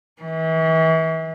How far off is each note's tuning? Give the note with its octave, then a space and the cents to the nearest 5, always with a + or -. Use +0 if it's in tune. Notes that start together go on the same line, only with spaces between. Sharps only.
E3 -35